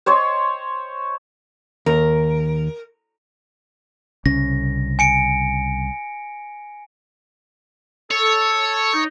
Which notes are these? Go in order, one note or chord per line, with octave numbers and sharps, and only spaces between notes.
C5 C#5 D#5 C6
D#2 A#4
C2 C#3 C#4 A#6
G#5 C#7 D7
A4 C#5
D#4